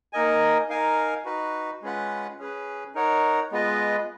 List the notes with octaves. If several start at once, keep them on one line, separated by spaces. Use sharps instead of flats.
A#3 D#4 A#4 D#5 G#5
D#4 A#4 F5 G#5
D#4 F#4 B4
G#3 C#4 F4 B4 F#5
C#4 G#4 B4
D#4 A#4 C#5 F#5
G#3 B3 F4 B4 D#5